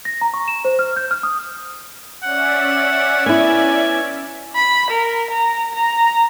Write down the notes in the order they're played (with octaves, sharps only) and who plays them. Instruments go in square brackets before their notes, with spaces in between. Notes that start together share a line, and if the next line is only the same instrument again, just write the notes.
[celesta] A#6
A#5
C#6
E7
C5
F6
G6
F6
D#6
[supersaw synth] C#4 D5 E5 [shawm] F#5
[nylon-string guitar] B3 E4 [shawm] G#5
[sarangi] B5
A#4
A#5
A#5